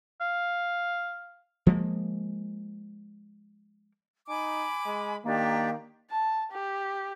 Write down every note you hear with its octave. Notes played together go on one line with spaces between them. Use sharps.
F5
F3 G#3 A#3
D#4 G#5 B5 D6
G#3
D#3 A#3 D4 G4
A5
G4